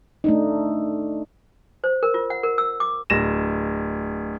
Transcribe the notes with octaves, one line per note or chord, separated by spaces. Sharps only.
A3 D4 D#4
C5
A#4
F4
F#5
A#4
E6
D6
D1 A#6 E7